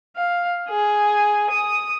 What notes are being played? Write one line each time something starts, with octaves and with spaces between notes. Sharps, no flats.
F5
G#4
D#6